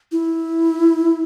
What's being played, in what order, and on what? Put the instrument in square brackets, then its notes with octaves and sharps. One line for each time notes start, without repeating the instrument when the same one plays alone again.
[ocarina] E4